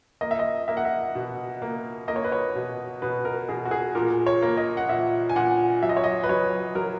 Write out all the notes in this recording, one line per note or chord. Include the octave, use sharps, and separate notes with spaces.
A#3 D#5
E5
D#5
A#3 E5
F#5
E5
B2
A#3
A#3 D#5
C#5
B4
C#5
B2
B2 B4
A#4
B2 G#4
F#4
G#4
A#2 A#4
C#5
A#3
D#5
F#5
A#2 E5
G#5
A#2 F#5
F#3 E5
D#5
C#5
D#5
B4
F#3 C#5
F#3 A#4